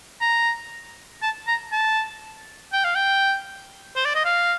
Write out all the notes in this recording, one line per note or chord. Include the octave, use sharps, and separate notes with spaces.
A#5
A5
A#5
A5
G5
F5
G5
C5
D5
D#5
F5